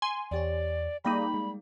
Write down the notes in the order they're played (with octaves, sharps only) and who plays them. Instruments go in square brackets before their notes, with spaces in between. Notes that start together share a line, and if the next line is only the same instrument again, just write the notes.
[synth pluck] G#5 C6
[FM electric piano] E2 G4 C#5 [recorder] D5
[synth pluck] G3 A#3 D#4 [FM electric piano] G#4 F5 G5 [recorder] B5
[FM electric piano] G#3